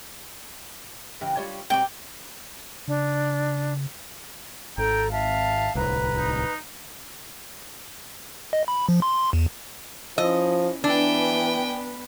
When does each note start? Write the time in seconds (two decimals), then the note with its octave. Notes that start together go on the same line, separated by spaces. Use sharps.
1.21 C#3 E3 G4
1.37 G3 F4 C#5
1.70 B2 G3 C4 G5 D6
2.88 C#3 D4
4.78 G#1 A4 G5 A#5
5.11 E5 F5 A5
5.75 D1 C2 B4 A#5
6.16 D#4
8.53 D#5
8.68 B5
8.89 F3
9.02 C6
9.33 E2
10.18 F3 C#4 E4 D#5
10.84 E3 B3 D4 B4 G5 G#5